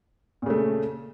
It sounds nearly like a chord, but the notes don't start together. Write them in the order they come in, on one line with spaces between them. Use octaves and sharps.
A#2 C#3 A3